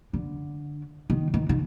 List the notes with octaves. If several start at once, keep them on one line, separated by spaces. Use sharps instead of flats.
D3
D#3
D#3
D#3